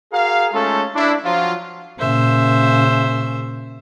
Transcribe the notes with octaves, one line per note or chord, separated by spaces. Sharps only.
F#4 G#4 A#4 F5
G#3 A3 C#4 D#4 F4 A4
D4 E4
F3 F#3 F4
A#2 C#3 C5 E5